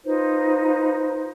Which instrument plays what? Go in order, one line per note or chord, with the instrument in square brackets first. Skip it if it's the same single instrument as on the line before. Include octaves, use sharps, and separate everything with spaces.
[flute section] D#4 F4 B4 C5